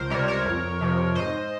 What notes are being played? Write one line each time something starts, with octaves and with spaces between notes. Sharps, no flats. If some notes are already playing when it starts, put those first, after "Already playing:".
Already playing: C#2 A#4 C5
C3 G3 A#4 C#5
A#4 C#5
F2
C3 F3
G#2 C5 D#5